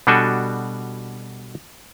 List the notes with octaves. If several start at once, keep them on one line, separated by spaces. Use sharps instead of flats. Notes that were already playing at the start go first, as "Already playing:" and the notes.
B2 G3 D4 F#4 A4 G#5